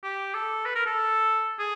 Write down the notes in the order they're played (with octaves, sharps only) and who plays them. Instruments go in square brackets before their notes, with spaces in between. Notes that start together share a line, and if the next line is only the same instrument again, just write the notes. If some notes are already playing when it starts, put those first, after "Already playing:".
[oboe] G4
A4
B4
A#4
A4
G#4